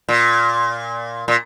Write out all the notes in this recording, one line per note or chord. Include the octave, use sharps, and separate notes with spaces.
A#2
A#2